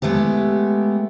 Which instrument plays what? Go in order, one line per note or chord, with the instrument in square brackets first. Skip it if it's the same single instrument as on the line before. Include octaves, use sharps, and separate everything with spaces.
[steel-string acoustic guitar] G#3 A3 B3 G4